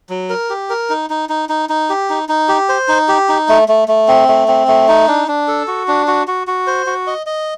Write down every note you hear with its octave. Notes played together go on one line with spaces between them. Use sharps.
F#3
A#4
G4
A#4
D#4
D#4
D#4
D#4
D#4
G4
D#4
D#4
G4
C5
D#4
G4
D#4
A3
A3
A3
C4
A3
C4
A3
D#4
D4
D4
A4
F#4
D4
F#4
F#4
F#4
C5
F#4
D#5
D#5